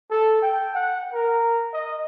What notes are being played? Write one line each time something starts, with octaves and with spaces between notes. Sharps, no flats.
A4
G5
F#5
A#4
D#5